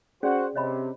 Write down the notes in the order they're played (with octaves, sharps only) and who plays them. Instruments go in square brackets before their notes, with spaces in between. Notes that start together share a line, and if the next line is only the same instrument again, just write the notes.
[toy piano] C#4 G#4 D5 [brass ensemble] F#4 C5 F#5
[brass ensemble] C3 [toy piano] C#5 D#5 B5